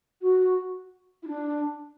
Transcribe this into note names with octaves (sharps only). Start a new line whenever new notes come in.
F#4
E4
D4